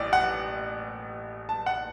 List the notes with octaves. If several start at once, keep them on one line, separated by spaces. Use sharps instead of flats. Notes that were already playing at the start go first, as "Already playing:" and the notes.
Already playing: A1 A2 D5
F#5
A5
F#5